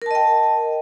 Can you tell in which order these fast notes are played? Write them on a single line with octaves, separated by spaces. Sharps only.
A#4 A5 D#5 G5